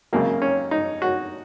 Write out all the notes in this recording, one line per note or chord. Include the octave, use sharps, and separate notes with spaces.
G#1 F#2 C#3 A#3
C#4
D#4
F#4